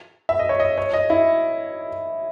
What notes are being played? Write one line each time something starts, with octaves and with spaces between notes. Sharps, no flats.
E5
D#5
C#5
D#5
C#5
D#5
E4